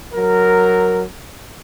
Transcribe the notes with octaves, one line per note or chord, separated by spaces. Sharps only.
F#3 A#4